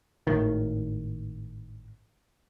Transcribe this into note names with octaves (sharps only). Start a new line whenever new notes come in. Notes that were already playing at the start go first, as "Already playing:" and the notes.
G#1 A2 D#3